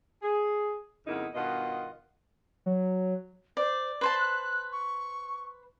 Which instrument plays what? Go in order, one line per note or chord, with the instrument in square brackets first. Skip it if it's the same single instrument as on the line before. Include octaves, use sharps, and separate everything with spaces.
[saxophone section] G#4
F2 C#3 A#3 B3 D#4 E4
G2 B2 D#3 F4 D#5 F#5
[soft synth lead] F#3
[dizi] C5 [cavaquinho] D5
[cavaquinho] B4 C5 A5 [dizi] C6
[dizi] F#6
C#6